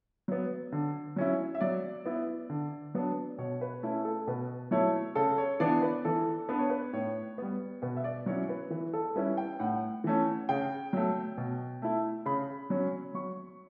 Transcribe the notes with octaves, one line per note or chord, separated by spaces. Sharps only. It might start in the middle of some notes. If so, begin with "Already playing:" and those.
F#3 B3
D3
F#3 C#4 E4
E5
F#3 D5
B3 E4
D3
F#3 B3 D4
B2 C#5
B4
A3 C#4 E4
A4
B2 B4
F#3 A3 E4 C#5
C#3 A4
C#5
E3 B3 D4 D5
B4
E3 A4
B3 D4 B4
C#5
B4
A2 C#5
G3 B3
B2 B4
E5
D5
F#3 C#4 E4 C#5
B4
E3 B4
A4
G3 C#4 E4 B4
G5
A2 F#5
E3 A3 C#4
C#3 G5
F#3 A3
B2
A3 E4
C#3 B5
F#3 C#4
F#3 C#6